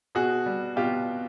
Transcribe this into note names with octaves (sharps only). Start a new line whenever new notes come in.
B2 F#4 G#4
G3
B2 F4 G4